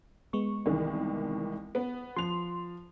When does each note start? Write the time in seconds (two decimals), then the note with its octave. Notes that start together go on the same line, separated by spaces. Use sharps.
0.33 G#3 B3 C#6
0.66 C2 D#3 E3
1.75 B3
2.16 F3 C6 F7